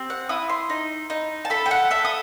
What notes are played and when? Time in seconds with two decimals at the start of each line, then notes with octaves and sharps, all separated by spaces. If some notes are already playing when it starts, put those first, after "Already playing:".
Already playing: C4 G4
0.10 F#5
0.29 E4 D#6
0.50 C6
0.70 D#4
1.10 D#4
1.45 A5
1.50 A4 B5
1.66 G5
1.71 F#5
1.91 A4 E5
2.05 D#6